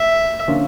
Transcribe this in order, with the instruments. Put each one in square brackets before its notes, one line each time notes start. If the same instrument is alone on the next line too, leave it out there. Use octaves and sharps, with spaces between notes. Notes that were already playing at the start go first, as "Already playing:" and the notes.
Already playing: [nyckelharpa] E5
[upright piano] D3 F3 A#3 C#4 F4